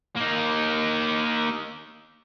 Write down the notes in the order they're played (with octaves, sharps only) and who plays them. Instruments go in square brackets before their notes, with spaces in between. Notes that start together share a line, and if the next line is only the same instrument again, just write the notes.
[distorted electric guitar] A#3 D#4